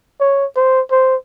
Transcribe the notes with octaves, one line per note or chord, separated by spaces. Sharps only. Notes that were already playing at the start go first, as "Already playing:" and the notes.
C#5
C5
C5